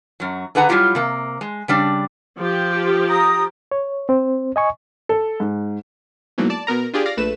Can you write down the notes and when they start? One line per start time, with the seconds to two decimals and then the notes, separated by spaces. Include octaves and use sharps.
0.20 F#2 F#3
0.55 D3 G#4 B4 F#5 G5 A#5
0.69 F#3 G3 E4 F4 G4
0.95 C3 A#3
1.41 G#3
1.68 C#3 G3 D4
2.37 F3 G4
3.09 A#5 D#6
3.72 C#5
4.09 C4 C5
4.56 D#5 G#5 C#6
5.09 A4
5.40 G#2
6.38 G#2 B2 E3 F#3 A3 A#3
6.50 D5 A5
6.67 B2 B3 A#4 A#5
6.93 D4 F4 G4 G#4 D5
7.06 D5 F5 A#6
7.17 A#1 A3 B4 E7